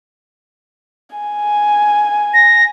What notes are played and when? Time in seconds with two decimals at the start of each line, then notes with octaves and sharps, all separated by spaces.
1.16 G#5
2.34 A#6